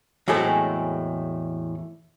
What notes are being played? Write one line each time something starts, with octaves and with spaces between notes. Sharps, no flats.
E2 A2 F#3 G#3 A3 C4